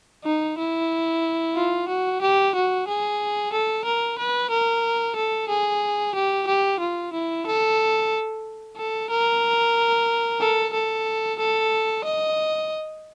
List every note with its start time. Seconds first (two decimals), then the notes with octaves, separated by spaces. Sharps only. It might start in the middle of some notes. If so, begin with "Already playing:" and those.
0.25 D#4
0.58 E4
1.56 F4
1.89 F#4
2.22 G4
2.55 F#4
2.88 G#4
3.53 A4
3.85 A#4
4.18 B4
4.50 A#4
5.16 A4
5.49 G#4
6.15 G4
6.47 G4
6.80 F4
7.13 E4
7.46 A4
8.77 A4
9.10 A#4
10.41 A4
10.73 A4
11.39 A4
12.05 D#5